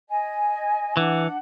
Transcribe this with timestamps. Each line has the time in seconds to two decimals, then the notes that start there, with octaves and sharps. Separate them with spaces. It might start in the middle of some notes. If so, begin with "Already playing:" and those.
0.09 D#5 G#5
0.97 E3 D4 F#5